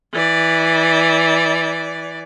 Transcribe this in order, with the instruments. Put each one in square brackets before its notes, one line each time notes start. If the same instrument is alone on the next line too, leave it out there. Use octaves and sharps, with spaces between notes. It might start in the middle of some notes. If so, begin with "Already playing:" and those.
[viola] E3 D5